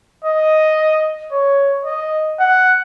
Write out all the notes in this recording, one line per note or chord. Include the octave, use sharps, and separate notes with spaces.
D#5
C#5
D#5
F#5